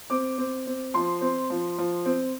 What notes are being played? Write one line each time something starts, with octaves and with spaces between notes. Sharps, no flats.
C4 D6
C4
C4
F3 C6
C4
F3
F3
C4